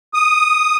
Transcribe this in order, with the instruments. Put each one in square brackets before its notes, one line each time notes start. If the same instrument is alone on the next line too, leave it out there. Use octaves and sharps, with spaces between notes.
[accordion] D#6